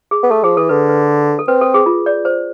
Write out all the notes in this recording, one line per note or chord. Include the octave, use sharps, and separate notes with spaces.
G#4
B3
A3 A4
F3 G#4
E3 A4
D3 B4
B4
A4
C4 B4
A4
G#4
F4
D5
C5